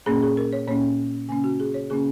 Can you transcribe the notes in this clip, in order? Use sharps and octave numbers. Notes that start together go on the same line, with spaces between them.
A#2 A#3 C#4 G#4
G#4
A#4
C#5
A#2 A#3 C#4 C#5
C#3 A#3 C#4 G#5
F#4
G#4
C#5
C#3 A#3 C#4 G#4